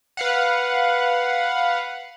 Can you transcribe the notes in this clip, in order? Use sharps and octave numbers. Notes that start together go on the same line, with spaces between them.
B4 F5 F#5